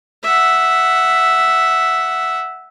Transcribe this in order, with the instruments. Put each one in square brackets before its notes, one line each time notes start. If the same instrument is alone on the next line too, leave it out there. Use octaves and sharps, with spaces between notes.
[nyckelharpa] E5 F#5